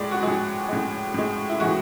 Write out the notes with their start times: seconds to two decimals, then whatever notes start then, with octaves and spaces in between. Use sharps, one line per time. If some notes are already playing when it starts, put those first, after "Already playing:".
Already playing: A2 G#3 D5
0.11 F#4
0.23 A2 G#3 G#4
0.69 A2 G#3
1.14 A2 G#3
1.49 E4
1.60 A2 E3 G#3 F#4